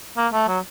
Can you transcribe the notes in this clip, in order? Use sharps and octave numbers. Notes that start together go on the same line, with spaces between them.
A#3
A3
F#3